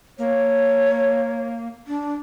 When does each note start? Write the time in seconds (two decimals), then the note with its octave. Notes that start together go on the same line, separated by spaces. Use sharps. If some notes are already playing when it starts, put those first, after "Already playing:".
0.19 A#3 C#5
1.87 D4